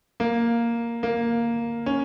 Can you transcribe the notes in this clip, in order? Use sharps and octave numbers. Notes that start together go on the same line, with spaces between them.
A#3
A#3
C#4